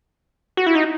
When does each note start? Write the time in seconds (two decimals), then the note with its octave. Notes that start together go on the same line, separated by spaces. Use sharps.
0.57 F#4
0.66 E4
0.75 D#4